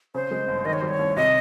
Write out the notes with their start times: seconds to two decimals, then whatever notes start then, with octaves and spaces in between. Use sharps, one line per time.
0.15 C#3 C5
0.31 G#3
0.48 G1
0.65 D#3 D#5
0.73 C#5
0.81 G3 C5
0.89 C#5
0.99 C2
1.16 C3 D#5